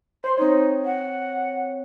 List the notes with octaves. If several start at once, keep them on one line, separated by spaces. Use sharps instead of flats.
C5 C6
C4 D#4 C#5
F#5